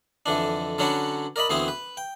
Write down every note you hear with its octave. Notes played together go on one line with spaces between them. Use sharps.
F2 D3 E3 D4
D3 F#3 C#4 D4 F#4 B4
A#4 D5 D#5 B5
D2 E3 B3 C4 G#4 D#6
B4
G5